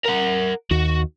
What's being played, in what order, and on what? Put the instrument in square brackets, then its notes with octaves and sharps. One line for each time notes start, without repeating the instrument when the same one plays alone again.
[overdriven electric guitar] A#4 F#5
[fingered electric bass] D#2 [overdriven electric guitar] F#4